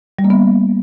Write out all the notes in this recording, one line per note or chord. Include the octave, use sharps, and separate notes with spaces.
G3
A#3
B3